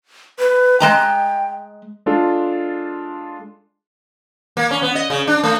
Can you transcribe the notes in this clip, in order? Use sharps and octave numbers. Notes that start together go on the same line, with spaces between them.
B4
G#3 D#5 G5 A#5
G#3 D4 F4 A4
A#3
C#4
B3
D#5
C#3
D4
A3